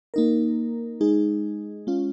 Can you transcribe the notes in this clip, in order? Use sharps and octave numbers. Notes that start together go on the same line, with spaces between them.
A#3 D#4 A#4
G#3 D#4 G#4
G#3 C#4 F4